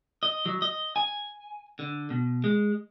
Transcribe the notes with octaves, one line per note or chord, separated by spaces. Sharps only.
D#5
F#3
D#5
G#5
D3
B2
G#3